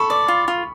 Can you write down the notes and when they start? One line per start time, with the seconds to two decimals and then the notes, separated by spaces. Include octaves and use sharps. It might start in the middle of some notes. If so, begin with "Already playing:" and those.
Already playing: A4 B5 C#6
0.10 D5
0.28 F4
0.48 F4